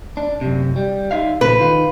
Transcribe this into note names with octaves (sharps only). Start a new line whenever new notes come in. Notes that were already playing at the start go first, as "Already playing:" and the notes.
D4
F#2 C3
G3
D#4 E5 F5
A#2 C#3 F3 B4
D#3 F4